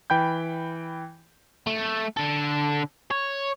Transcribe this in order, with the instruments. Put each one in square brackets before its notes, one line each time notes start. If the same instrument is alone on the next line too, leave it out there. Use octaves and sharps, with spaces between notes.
[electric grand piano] E3 G5 B5 G6
[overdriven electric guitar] A3
D3 A4
C#5